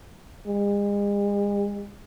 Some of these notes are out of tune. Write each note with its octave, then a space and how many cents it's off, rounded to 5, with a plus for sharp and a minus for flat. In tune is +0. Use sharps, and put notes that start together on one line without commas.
G#3 -40